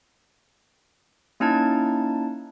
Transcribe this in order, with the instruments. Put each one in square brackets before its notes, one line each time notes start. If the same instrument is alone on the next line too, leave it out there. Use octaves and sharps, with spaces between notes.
[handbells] A#3 C#4 D#4 E4 A5 G#6